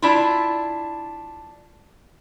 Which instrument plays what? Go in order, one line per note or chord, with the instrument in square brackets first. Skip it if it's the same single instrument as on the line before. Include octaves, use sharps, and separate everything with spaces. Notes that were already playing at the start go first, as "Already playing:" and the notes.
[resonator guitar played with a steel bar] D4 E4 F4